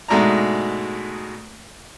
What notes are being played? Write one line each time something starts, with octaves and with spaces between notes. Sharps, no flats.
G#2 B2 G#3 A3 D4 A#5